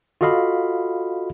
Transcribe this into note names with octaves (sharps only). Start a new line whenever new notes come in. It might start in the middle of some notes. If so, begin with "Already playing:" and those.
F4 F#4 A4 D#5 F5 B5